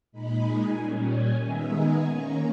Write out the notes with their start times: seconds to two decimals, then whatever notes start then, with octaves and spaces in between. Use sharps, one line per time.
0.12 A#2 G#3 D#4 B5
0.45 G#5
0.77 A#2 G3 C#4
1.10 G#5
1.42 D#3 G#3 B3 D#4 E5
1.75 G#5
2.07 D#3 A#3 C#4 A#5